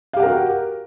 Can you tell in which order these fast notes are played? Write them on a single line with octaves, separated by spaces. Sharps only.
F5 G4 F#5 A#4 F#4